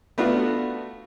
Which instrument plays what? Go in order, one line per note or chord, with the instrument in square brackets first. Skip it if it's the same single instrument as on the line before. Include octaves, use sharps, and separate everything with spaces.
[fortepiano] A3 B3 D4 F4 F#4